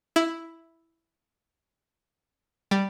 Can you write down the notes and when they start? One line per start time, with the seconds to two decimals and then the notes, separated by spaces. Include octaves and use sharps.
0.16 E4
2.71 G3